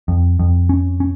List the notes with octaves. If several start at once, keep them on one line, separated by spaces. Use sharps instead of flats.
F2
F2
C#4
C#4